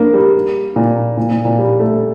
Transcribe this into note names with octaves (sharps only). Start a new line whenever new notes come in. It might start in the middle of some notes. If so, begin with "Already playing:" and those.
Already playing: A#3 D4
G3
A#2
A#2
A#2
A#2
G3
A3